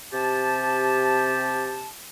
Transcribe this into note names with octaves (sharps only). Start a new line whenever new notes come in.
C3 G4 A5